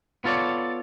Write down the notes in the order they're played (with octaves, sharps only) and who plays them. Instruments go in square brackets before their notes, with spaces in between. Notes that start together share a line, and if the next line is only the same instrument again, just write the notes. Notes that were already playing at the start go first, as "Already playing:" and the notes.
[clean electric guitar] B3 F4 A4 C#5 D5